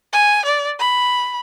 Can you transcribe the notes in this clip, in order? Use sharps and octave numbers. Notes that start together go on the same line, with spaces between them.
G#5
D5
B5